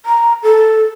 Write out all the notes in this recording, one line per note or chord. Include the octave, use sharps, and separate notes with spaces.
A#5
A4